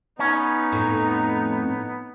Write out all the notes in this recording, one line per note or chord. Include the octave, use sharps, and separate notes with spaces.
B3 C#4 D#4
F2 A2